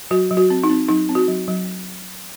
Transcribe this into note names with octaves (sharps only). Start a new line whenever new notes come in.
F#3 F#4
F#3
F#4
C4
D#4
C4
F#3 D#4
C4
F#4
F#3
F#3